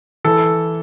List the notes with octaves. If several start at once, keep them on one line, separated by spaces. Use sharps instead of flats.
E3 A4